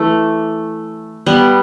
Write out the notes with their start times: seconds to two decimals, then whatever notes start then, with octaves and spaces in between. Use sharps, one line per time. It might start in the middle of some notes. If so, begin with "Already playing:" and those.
Already playing: E3 A3
1.26 G3 B3